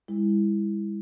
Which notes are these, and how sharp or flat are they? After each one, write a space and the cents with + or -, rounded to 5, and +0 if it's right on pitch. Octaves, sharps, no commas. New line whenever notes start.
G#3 -45 E4 +0